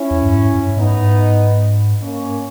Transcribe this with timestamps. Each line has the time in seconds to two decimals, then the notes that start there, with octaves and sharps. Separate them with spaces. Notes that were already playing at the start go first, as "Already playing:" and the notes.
Already playing: C#4 E4
0.11 E2
0.22 G2
0.35 G#2
0.55 G2
0.76 G#2 B3 D#4
2.02 A#3 C#4